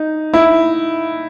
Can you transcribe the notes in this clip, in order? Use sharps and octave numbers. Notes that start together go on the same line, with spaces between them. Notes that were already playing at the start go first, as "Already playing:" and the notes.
Already playing: D#4
E4